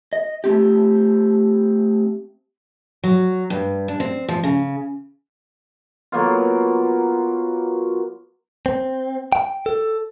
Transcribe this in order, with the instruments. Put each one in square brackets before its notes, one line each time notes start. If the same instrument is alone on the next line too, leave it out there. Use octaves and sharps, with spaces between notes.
[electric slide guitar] D#5
A3 C4 G4
[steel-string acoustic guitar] F#3
G2
D4
C4
F3
C#3
[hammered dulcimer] F#3 A#3 B3 F4
[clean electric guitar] C4
G5
A4